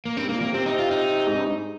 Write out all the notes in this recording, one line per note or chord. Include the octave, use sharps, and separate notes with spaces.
A#3
G2 C4
G#2 A#3
A#2
C3 A#3
C3 C4
D#4
F4
D#4
G#2
G2
G#2